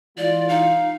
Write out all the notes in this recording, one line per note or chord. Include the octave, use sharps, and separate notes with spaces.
E3 G#3 F4 D5
D#4 F5